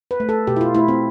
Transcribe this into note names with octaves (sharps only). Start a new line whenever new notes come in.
B4
A3
A4
B2 G4
E4
F4
A3 E4
C4